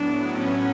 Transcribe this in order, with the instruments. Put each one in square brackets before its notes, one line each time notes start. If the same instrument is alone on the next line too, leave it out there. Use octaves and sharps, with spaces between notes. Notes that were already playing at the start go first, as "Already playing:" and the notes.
Already playing: [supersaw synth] A2 F#3 B3 [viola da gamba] D4
[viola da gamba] C#4